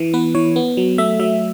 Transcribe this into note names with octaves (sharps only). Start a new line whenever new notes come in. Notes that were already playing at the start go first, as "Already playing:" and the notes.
Already playing: E3
B3 B4
E3 C#5
B3
F#3
A3 E5
F#3 E5